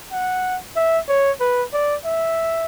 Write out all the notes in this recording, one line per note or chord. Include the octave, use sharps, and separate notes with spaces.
F#5
E5
C#5
B4
D5
E5